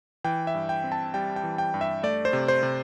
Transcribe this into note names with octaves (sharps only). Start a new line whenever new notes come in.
E3 G5
E5
G2
G5
C4
A5
G3 G5
G5
E3
G5
G2
E5
A3 D5
C5
C3
C5
C3